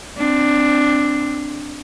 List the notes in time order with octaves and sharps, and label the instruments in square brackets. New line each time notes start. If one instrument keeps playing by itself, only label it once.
[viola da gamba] C4 D4